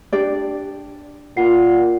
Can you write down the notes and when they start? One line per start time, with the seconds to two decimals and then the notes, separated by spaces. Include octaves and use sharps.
0.13 D4 G4 D5
1.37 A#2 F4 F#5 C7